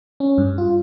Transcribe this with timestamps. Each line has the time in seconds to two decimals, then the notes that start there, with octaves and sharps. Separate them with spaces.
0.20 C#4
0.38 G2
0.58 F4